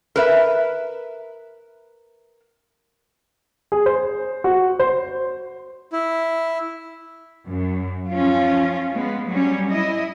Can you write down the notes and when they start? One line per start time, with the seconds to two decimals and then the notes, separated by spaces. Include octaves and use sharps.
0.16 A#4 B4 E5
3.72 G#4
3.86 C5
4.44 F#4
4.79 C5
5.93 E4
7.48 F#2
8.11 F3 C#4 F4
8.93 G#3 B3
9.29 F#3 G3 C#4
9.72 E4 D#5